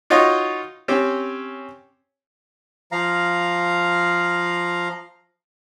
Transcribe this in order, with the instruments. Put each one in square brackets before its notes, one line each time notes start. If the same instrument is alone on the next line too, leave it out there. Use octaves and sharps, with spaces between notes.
[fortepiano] D#4 F4 F#4 C#5 D#5
C4 C#4 G4
[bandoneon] F3 F5 A#5